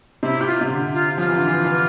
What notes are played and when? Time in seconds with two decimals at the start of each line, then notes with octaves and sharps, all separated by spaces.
0.23 C3 E4
0.41 G4
0.47 F4
0.61 C3
0.70 D3
0.93 F4
1.18 F3 F4
1.27 E3
1.36 D3
1.47 E3
1.65 E3